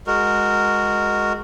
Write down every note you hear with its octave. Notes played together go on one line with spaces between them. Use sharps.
G#3 F#4 A#4